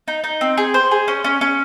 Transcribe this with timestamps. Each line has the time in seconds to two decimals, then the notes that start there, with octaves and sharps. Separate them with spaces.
0.08 D#4
0.24 D#4
0.41 C4
0.57 G#4
0.74 C5
0.91 G#4
1.08 C#4
1.24 C#4
1.41 C#4